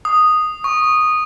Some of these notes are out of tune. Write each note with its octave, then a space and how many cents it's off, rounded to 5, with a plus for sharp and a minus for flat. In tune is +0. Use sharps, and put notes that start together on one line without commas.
D#6 -5
C#6 +5